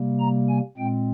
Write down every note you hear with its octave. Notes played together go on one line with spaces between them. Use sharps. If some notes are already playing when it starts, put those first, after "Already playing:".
Already playing: C3 G3 A#3
A#5
G#5
A#2 G#3 C4 G5